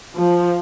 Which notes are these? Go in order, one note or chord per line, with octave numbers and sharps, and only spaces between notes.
F3